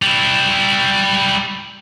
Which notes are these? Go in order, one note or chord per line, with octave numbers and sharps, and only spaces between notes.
G3 E4